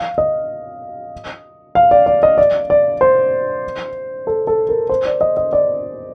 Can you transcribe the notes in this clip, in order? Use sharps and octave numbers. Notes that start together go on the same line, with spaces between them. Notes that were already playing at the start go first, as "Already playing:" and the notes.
Already playing: F5
D#5
F5
D5
D5
D#5
D5
D5
C5
A4
A4
A#4
C5
D5
D#5
D#5
D5